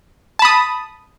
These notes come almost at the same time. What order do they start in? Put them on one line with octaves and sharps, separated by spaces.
A5 B5 D#6